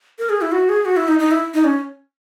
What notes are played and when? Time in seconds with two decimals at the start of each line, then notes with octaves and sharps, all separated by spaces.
0.19 A#4
0.30 G#4
0.41 E4
0.52 F#4
0.69 G#4
0.85 F#4
0.97 E4
1.08 D#4
1.19 D#4
1.31 E4
1.54 D#4
1.64 C#4